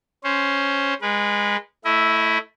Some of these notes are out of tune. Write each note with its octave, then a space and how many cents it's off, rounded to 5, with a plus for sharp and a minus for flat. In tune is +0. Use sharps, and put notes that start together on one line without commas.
C#4 +0 C5 +0
G#3 -20 B4 -35
A3 +0 E4 +0 D#5 +35